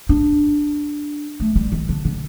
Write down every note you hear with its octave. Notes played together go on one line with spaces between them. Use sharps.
D4
A3
G3
D#3
D3
D3